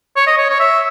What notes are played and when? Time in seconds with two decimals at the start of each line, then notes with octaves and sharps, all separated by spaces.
0.16 C#5
0.27 D#5
0.38 C#5
0.49 C#5
0.60 E5